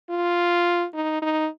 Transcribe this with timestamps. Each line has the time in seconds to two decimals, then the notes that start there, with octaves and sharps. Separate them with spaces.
0.10 F4
0.94 D#4
1.22 D#4